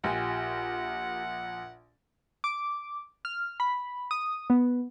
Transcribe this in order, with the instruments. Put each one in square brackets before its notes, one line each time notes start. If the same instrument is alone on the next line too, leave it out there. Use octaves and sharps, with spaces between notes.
[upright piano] A#1 [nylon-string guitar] F4 G4 G#5 [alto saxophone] F#5
[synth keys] D6
F6
B5
D#6
B3